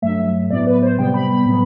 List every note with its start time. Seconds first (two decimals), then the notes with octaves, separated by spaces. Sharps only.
0.02 G2 F#3 A3 E5
0.50 A2 F#3 B3 D5
0.67 B4
0.83 C5
0.99 C3 G3 B3 G5
1.14 B5
1.30 B5
1.46 A2 F#3 B3